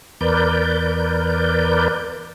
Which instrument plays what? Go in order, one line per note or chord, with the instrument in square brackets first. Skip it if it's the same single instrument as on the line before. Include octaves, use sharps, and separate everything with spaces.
[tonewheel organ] E2 A#4 B4 D5 G6